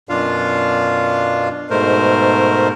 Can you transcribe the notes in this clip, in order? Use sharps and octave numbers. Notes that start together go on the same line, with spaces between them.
F#2 B2 D4 F4 F5
G#2 B2 A3 A#4 C5